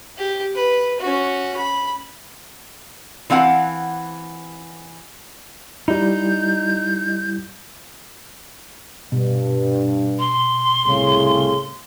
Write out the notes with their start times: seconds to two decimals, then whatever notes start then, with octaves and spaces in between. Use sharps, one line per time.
0.18 G4
0.55 B4
1.00 C#4 F#4
1.57 B5
3.30 E3 C4 F5 F#5
5.88 G3 D#4 E4 G6
9.12 G2 B2
10.19 C6
10.86 C2 A2 C#3